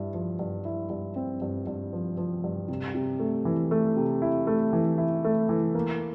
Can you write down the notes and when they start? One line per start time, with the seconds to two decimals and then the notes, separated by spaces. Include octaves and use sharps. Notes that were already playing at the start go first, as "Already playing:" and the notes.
Already playing: G2 E4
0.14 F3
0.39 G2
0.65 E4
0.90 G2
1.16 C4
1.42 G2
1.67 G2
1.93 F3
2.17 F3
2.44 G2
2.68 C3
2.95 C3
3.19 A3
3.45 E3
3.71 A3
3.96 C3
4.22 E4
4.47 A3
4.73 E3
4.98 E4
5.25 A3
5.49 E3
5.75 A#3